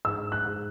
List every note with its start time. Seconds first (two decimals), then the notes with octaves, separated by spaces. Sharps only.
0.05 G#2 E6
0.32 F#6
0.45 G#2